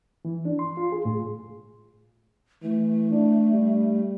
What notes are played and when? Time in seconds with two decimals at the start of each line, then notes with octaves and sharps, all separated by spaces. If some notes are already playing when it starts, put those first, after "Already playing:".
0.25 E3
0.45 D4
0.59 C6
0.77 F4
0.92 G#4
1.05 A2
2.63 E3 A3
3.11 D4
3.52 G3